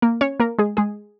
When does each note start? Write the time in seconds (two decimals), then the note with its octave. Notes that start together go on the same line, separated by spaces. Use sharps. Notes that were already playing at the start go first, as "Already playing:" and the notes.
0.02 A#3 A#4
0.21 C#4 C#5
0.40 A#3 A#4
0.59 G#3 G#4
0.77 G#3 G#4